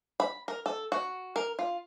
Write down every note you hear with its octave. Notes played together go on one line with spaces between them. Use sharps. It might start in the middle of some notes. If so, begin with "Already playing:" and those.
B5
A#4
A4
F#4
A#4
F4